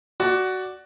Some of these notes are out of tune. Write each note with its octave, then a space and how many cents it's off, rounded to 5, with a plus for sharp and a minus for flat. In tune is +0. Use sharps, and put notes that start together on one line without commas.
F#4 +10 D5 +0